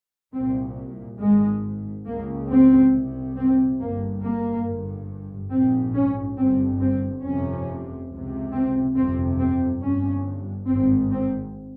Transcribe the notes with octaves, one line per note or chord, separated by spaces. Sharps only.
C2 A#2 C4
G#1 G#2 G#3
C#2 C#3 A#3
C4
C2 C3
C4
G1 G2 A#3
A#3
G1 G2
A#1 G#2 C4
C#4
G1 G2 C4
C4
F1 F2 C3 C#4
C#2 C3
C4
G1 F2 C3 C4
C4
G1 G2 C#4
G#1 G#2 C4
C4